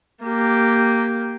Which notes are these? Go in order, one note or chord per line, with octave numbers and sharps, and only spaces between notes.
A#3 G4